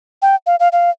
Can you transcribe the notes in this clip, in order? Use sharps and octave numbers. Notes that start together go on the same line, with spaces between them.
G5
F5
F5
F5